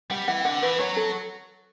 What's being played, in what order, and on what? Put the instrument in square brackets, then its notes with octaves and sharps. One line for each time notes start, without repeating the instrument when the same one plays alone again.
[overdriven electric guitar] G3 [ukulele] F#5
[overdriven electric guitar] E3 [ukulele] F#5
[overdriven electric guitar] D3 [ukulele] F#5
[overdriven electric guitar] E3 [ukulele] B4
[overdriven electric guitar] F#3 [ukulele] C#5
[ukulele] A4